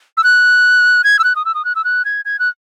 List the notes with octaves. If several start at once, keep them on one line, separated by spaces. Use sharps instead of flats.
E6
F#6
G#6
E6
F#6
D#6
E6
D#6
F#6
E6
F#6
G#6
G#6
F#6